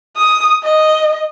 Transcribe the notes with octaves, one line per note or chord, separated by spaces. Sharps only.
D#6
D#5